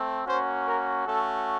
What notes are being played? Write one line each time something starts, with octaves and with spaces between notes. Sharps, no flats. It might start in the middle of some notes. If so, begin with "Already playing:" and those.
Already playing: A3 C4
A#3 C#4 F#4 C5
A#4
A3 C#4 F#4 A4